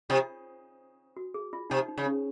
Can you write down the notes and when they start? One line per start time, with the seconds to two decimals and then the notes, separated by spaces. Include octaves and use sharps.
0.09 C3 F4
1.17 F#4
1.34 G#4
1.53 F4
1.70 C3 D#4
1.89 D#4
1.98 C#3
2.06 C#4